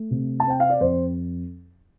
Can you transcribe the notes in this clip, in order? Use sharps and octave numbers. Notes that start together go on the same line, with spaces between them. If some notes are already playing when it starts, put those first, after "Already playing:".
Already playing: A3
C3
A5
C4 G5
F5
D5
F2 C5